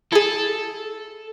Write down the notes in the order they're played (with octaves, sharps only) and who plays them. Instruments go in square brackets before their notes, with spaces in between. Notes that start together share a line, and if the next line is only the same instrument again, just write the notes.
[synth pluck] E4 G#4 [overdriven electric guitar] A4